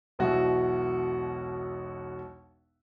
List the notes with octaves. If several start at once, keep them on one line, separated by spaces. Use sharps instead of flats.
E1 B1 B2 E4 F#4